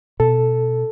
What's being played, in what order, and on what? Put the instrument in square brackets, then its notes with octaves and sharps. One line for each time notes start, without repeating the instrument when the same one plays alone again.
[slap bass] B2 [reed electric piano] A4